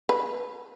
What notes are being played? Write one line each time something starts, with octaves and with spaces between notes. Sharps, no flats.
B4